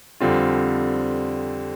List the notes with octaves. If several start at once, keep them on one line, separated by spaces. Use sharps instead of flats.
F2 D3 G3 C4 F4